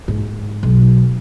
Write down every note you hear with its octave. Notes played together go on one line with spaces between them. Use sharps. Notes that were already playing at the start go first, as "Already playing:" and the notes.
G#2
B1